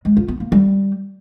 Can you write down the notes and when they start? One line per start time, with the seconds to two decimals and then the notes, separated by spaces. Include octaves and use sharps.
0.05 G#3
0.17 F4
0.28 B3
0.40 A#3
0.52 G3